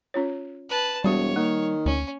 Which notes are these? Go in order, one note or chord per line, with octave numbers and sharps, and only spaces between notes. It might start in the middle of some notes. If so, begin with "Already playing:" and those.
C#4 F4 C#5
B4 A5
E1 G3 F#4 C#5 D5
D#3 A#3
D2 C#4